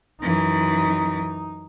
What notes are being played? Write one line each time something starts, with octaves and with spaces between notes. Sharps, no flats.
F#2 E3 D#4